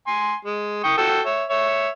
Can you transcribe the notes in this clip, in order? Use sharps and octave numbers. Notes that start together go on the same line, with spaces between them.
G#5 C6
G#3
G5 C#6 D#6
F#4 A4 G5
C#5 E5
C#5 E5